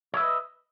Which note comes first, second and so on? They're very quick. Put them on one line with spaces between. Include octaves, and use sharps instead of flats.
C#5 E5 B4 D#5